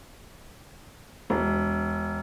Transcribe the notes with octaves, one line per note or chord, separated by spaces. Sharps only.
E1